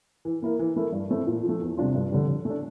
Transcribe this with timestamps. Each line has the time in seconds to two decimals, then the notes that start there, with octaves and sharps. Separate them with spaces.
0.25 E3
0.42 A#3 E4 A#4
0.59 E3
0.76 A3 E4 A#4
0.92 G2
1.10 E3 A3 C4 E4
1.27 A#2
1.43 F3
1.49 A3
1.61 E2
1.77 C3 G3 D4 F4
1.95 G2
2.12 D3 G3
2.28 D3
2.45 A3
2.50 D4